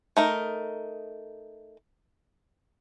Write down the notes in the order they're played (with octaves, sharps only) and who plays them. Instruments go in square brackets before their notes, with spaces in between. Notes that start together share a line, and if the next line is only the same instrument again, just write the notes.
[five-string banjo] A3 D#4 A#4